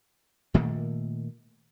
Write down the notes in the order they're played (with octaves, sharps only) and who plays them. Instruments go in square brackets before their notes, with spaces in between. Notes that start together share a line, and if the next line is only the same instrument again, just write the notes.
[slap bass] A#2 D#3 A3 A#3